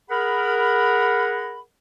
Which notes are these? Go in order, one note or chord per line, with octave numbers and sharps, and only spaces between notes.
G#4 A#4 F#5 B5